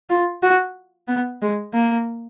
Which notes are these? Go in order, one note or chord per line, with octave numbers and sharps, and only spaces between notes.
F4
F#4
B3
G#3
A#3